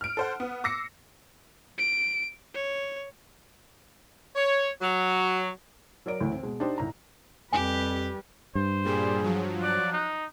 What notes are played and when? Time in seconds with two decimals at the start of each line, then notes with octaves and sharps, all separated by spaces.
0.01 F6 D7
0.17 A4 C5 F#5
0.40 B3
0.64 D6 E6 A#6 C7 C#7
1.78 D7
2.54 C#5
4.36 C#5
4.81 F#3
6.06 F#3 A#4 D5 D7
6.21 D2 A2 E3
6.32 C4
6.43 B2 G#3
6.60 D4 D#4 G4 C5
6.78 D#1 C2 A#5
7.53 F2 G3 G4 B4 G#5
8.55 G2 C5
8.85 A#2 G3 G#4
9.23 F3 F#3
9.62 D5 F#6
9.92 D#4